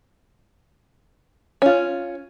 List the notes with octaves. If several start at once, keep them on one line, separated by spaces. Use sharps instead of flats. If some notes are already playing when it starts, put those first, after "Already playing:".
C#4 F4